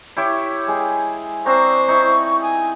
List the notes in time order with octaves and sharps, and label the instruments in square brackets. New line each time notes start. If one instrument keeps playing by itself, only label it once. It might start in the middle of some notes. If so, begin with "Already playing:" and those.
[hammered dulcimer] E4 G4 C#5
G#3 G#4
[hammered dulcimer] C4 D4 A#5 [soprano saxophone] C5 [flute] C#6
[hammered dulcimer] D#4 E4
[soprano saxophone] G#5 [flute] D#6